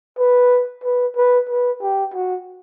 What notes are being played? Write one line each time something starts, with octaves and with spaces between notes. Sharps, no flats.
B4
B4
B4
B4
G4
F#4